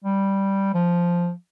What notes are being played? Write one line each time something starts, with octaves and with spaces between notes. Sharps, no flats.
G3
F3